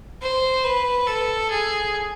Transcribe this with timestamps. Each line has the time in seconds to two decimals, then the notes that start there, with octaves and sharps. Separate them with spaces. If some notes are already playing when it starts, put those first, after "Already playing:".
0.22 C5
0.64 B4
1.07 A4
1.50 G#4